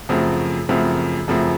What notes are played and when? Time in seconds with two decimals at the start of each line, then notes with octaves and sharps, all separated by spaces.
0.09 F#2 C#3 F3 A3 C4
0.69 F#2 C#3 F3 A3 C4
1.28 F#2 C#3 F3 A3 C4